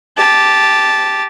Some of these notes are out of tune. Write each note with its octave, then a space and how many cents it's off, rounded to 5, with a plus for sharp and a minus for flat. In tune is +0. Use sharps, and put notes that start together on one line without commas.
G4 +0 A5 -10